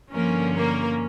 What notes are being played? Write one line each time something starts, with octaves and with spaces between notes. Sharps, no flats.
G2 D3 F3 A#3 C#4 A#4
A#3 A#4